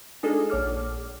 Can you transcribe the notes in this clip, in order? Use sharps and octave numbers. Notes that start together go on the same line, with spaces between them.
G#3 D4 D#4 F4 G#4 A4
A#1 C#5 D6 F6